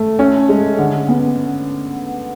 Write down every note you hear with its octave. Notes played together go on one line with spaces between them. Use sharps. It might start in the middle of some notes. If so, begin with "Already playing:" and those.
Already playing: A3
C#4
G#3
D3
B3